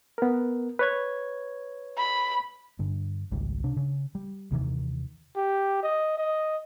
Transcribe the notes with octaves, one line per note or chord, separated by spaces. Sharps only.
B3 A#4
B4 C#5 G#6
B5
G2 D3
G#1 C#2 G3
C3 D4
C#3
G3
D#2 C3 D#3 E3
G4
D#5
D#5